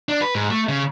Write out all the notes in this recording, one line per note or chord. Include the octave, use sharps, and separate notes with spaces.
D4
B4
G#2
A3
C#3